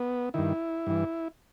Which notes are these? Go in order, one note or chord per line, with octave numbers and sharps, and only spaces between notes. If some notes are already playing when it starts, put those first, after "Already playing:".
Already playing: B3
G2 D#3 E4
G2 E3